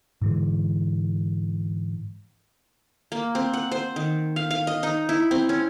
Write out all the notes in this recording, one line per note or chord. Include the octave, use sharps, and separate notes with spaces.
G#2 D3 E3 G#3
A#3
C4
F#5
C5
D#3
F5
F5
D#5
D#4
E4
C4
C#4